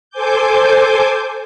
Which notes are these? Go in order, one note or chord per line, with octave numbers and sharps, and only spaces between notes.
A4 C5 G#5 D6 G6